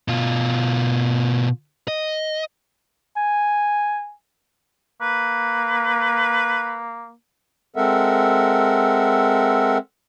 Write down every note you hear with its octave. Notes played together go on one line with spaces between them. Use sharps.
B2 F4
D#5
G#5
A#3 B4
G#3 C4 A4 A#4 E5 F#5